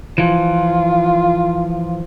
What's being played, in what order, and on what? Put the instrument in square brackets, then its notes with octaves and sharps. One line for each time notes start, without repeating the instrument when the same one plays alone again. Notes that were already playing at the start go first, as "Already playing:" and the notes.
[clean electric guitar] E3 F3 [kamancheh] F4